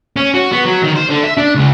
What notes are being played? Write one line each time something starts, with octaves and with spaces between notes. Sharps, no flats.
C#4
F#4
B3
F#3
D#3
C5
D3
E5
D4
C#2